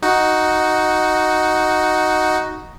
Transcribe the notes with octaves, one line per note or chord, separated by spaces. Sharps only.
D#4 F#4